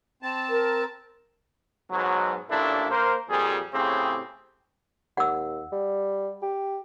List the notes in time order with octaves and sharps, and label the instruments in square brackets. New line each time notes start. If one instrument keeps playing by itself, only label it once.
[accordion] C4 A5
[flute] A#4
[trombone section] G#2 B2 F#3
A1 A#2 D4 E4 A4
A#3 A#4 C5
F2 A#2 G3 G#4
A2 C#3 C4 G4 G#4
[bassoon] D#2 [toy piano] F#5 E6
[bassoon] G3
G4